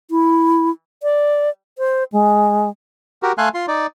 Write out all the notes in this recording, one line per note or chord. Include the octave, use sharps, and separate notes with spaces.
E4
D5
C5
G#3
F#4 G4 A#4
A3 A4 F5 G#5 C6 F#6
F4 C6
D#4 D5